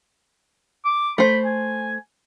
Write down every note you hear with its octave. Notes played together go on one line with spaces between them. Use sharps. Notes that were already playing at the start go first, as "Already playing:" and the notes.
D6
A3 C5 B5
G#5